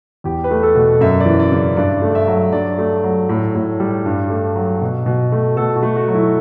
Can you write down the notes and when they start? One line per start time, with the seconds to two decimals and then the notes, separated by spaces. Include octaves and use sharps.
0.24 E2 G4
0.44 B4
0.51 A3
0.63 A4
0.75 B2
1.01 F#2 E5
1.20 D5
1.26 E3
1.40 D5
1.52 C#3
1.77 G2 D5
2.02 A3
2.15 E5
2.28 F#3
2.53 G2 D5
2.78 A3
3.04 F#3
3.29 A2
3.55 A2
3.80 G3
4.05 G2
4.30 A3
4.56 F#3
4.82 B2
5.06 B2
5.32 A3
5.57 B2 A4
5.76 F#4
5.83 A3
5.96 F#4
6.08 F#3
6.15 E4